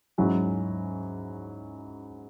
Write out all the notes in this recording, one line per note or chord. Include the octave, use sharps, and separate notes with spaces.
G#2 F#3 C#4 E4